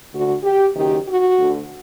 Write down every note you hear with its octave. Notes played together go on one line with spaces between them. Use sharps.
D2 D3 F#4
G4
F#1 F#2 D#3 G4
F#4
D2 D3